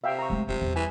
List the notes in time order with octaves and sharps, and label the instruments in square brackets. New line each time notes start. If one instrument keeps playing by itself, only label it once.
[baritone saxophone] C3 [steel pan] E5 F5 G5
[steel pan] A#5 C#6
[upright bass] G#3 A3
[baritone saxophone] C3 [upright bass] F3 F4
[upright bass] E2 G3
[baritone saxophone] E3 [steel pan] G#5